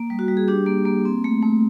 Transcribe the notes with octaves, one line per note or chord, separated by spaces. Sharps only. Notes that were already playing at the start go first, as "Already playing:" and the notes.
Already playing: A#3
G3
F#4
G3
G#4
D4 G4
A#3
A#3
C4
A3
A3